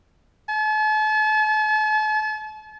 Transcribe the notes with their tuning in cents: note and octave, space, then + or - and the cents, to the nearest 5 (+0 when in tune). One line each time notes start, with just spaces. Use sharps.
A5 -40